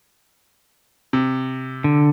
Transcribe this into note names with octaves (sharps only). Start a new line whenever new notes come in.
C3
D3